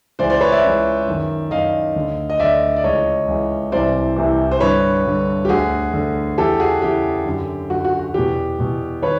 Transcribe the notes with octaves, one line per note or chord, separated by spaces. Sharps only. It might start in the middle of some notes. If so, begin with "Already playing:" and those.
C#2 C#3 E3 C5 D5
C5 D5
B4 C#5
D5 E5
C#2 C#3 E3
F#2 D#3
F#2 D#3 D#5 F5
D2 D3
D#5
D2 D3 D5 E5
D5
C#2 C#3 E3 C#5 D#5
C#2 C#3 E3
C2 C3 E3 C5 D5
C2 C3 E3
C5
G2 D3 B4 C#5
G2 D3
G4
D2 D3 F#4 G#4
D2 D3
E2 C#3 E3 G4 A4
F#4 G#4
E2 C#3 E3 G4
F#2 D3
F#2 D3 F#4
F#4
F#4
E2 B2 G4
E2 B2
D#3 B4 C#5